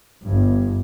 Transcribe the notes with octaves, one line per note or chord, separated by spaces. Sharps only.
G1 G2